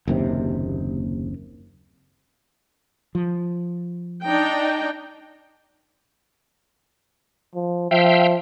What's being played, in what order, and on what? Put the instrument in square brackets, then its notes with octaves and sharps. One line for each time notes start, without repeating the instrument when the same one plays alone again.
[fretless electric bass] F#1 D#2 C3
F3
[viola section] D4 D#4 G5
[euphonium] F3
[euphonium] F3 [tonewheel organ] E5 F5 G5